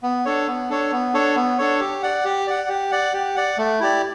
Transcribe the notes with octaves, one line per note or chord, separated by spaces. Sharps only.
B3
D4 A4 C#5
B3
D4 A4 C#5
B3
D4 A4 C#5
B3
D4 A4 C#5
G4
D5 F#5
G4
D5 F#5
G4
D5 F#5
G4
D5 F#5
A3
E4 G4 D5